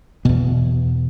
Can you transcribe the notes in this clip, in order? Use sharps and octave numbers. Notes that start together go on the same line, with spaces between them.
E2 B2 B3